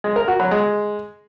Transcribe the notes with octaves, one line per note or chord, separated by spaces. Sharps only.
G#3
A#4
F#4
F#3
G#3